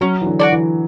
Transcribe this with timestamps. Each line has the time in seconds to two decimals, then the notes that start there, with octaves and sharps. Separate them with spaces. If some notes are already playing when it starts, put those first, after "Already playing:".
0.01 F#3 C#4
0.21 E3
0.26 D3
0.40 F#4 A4 D5
0.52 E3